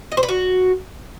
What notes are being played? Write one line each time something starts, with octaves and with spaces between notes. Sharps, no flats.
D#5
C5
B4
F#4